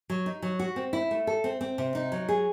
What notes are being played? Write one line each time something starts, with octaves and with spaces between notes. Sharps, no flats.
F#3
D#4
F#3
F#4
C4
E4
A3
A4
C4
C4
C3
D#4
F#3
G#4